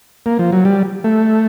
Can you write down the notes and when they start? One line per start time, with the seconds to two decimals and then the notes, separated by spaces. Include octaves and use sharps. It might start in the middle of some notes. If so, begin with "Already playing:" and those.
0.26 A#3
0.39 F3
0.52 F#3
0.65 G3
1.04 A3